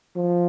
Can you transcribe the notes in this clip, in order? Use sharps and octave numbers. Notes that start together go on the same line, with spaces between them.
F3